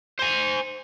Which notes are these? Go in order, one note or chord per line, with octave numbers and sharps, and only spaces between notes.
C5 G#5